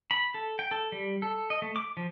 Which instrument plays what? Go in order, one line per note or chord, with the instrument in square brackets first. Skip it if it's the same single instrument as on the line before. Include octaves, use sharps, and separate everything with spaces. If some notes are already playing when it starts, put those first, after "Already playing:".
[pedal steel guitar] B5
A4
G5
A4
G3
A4
D#5
A3
D6
F3